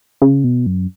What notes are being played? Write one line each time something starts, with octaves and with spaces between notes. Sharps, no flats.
C#3
B2
F#2